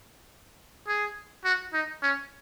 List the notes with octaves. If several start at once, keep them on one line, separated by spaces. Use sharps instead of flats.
G#4
F#4
D#4
C#4